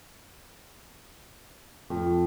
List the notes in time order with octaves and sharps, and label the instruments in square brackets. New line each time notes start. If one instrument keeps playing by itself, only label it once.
[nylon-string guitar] F2